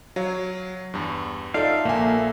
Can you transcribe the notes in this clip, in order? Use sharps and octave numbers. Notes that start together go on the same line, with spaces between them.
F#3 C#5 F5
E2 G2
D#4 F4 A4 D5 E5 F5
A#1 A#3 G#5